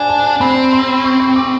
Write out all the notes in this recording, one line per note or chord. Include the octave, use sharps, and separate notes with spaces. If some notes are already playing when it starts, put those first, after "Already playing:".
Already playing: D4 F#5 G#5
A5
C4 B5
C6
C#6
C#6
D6